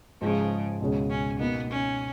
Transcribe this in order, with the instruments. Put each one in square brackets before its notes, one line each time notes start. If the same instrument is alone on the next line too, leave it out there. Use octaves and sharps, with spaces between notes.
[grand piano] G#2 F3 G#3 D#4 [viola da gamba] C#3
[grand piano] C#2 B2 G#3 C#4
[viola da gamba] C#4
[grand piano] B2 A#3 D#4 [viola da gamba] B3
[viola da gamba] C#4